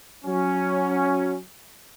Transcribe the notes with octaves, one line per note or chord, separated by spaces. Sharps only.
F#3 C#4